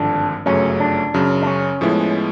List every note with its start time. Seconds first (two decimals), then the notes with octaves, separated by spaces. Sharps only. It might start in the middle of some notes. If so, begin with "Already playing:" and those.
Already playing: G#1 G2 D3 F3 D4
0.46 G1 F#2 C#3 F#3 A3 C#4
0.80 D4
1.14 F#2 C#3 F#3
1.42 D4
1.47 C#4
1.81 A2 F3 G#3 B3 E4